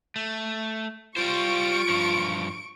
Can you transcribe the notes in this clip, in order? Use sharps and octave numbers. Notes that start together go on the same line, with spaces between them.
A3
G3 F4 C5 C#6 D7
G2 F3